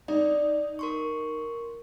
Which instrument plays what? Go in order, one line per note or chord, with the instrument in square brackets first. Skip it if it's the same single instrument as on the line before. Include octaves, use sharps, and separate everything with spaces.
[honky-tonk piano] D#4 [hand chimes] D5
[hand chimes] A#4 C6 C#6